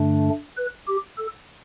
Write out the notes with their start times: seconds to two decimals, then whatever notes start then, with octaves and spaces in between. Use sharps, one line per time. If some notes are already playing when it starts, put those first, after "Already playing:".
Already playing: G2 D3 A3 D4
0.57 B4
0.87 G4
1.18 A4